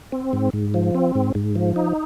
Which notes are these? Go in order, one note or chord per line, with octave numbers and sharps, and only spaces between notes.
C4
G#2
G#2
F3
C4
G#2
G#2
F3
D#4